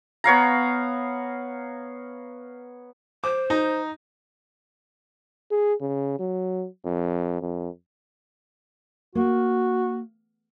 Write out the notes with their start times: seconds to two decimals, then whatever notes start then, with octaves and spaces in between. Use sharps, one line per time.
0.24 B3 C#5 F5 A#5
3.24 C5 D6
3.50 D#4 A#5
5.51 G#4
5.81 C#3
6.19 F#3
6.85 F2
7.41 F2
9.15 A#3 F#4